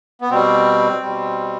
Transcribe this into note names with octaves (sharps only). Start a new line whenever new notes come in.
B3
B2 G3 C4
B2 G3